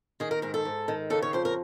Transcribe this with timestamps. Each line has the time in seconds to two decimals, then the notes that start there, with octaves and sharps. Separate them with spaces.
0.20 D#3 G#4
0.31 A#4
0.42 G#2 A#4
0.54 A4
0.65 G#2
0.88 D#3
1.10 C#3 A4
1.22 C#5
1.33 F2 C5
1.45 A#4